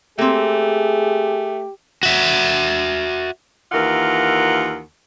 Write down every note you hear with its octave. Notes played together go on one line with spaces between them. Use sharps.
A3 A#3 C4 G4 G#4
F#4 E5
D#2 E3 F4 A#4 F#5